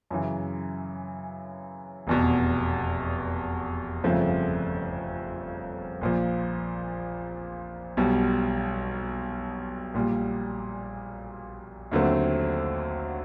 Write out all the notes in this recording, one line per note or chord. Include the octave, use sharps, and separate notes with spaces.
F#2 C#3 E3
F1 E2 B2
G1 F2 C#3 F3 A3
A#1 A#2 F3
B1 B2 G3
A#1 A#2 G3
D#2 D3 F#3 A3 C4